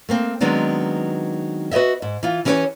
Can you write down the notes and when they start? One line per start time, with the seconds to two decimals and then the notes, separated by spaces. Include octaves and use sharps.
0.09 A3 A#3 C4
0.41 D#3 F#3 G#3 B3 C4 D4
1.71 F#4 B4 C#5 D#5 E5
2.02 G#2
2.23 E3 F4
2.45 E3 C#4 G4 G#4 B4 C#5